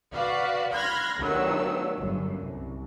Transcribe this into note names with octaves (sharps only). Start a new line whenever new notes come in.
F#4 B4 D5 F5
B5 C6 F6 F#6 G#6 A#6
G1 A2 D#3 F#3 E6
G1 F#2
C2